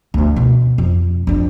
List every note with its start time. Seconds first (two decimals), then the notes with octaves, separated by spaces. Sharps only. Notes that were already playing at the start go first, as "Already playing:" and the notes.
0.14 D2 E3
0.36 B2
0.78 F2
1.27 F2 D4